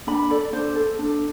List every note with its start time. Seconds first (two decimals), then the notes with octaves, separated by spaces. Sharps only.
0.07 D4 B5
0.30 A4 D5
0.53 D4 C5
0.75 A4
0.99 D4